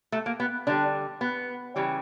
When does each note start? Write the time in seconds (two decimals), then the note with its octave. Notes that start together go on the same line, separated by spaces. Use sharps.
0.12 A3
0.26 A#3
0.40 B3
0.67 D3 G3 D4
1.21 B3
1.76 C#3 E3 G3